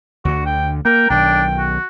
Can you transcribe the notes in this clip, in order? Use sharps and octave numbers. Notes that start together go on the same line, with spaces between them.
D2 D3 F#4
G5
A#3 A#4 G5
B1 D#3 D4 G5
F#4